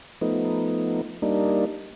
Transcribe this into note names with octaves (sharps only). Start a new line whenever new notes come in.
F3 A3 B3 D#4
G3 A#3 D4 D#4